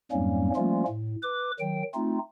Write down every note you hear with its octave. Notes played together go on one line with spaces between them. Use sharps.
F2 G#2 F#3 G3 A#3 C#4
F3 G3 A3 A#3 C#4 F4
A2
B4 D6
D#3 F#3 G5
A3 C4 D#4 F4